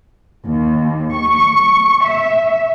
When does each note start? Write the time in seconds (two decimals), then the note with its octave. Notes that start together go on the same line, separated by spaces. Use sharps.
0.45 D#2
1.13 C#6
2.04 E5